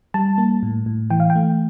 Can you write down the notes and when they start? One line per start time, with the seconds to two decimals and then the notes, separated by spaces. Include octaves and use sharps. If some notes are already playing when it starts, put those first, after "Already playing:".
0.14 G3 A5
0.38 A#3
0.63 A2
0.86 A2
1.10 E3 G5
1.20 F5
1.30 G5
1.35 A3